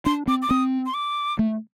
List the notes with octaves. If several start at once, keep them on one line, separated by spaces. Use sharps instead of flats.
D4 C6
C4 D6
D6
C4 D#6
C6
D6
A3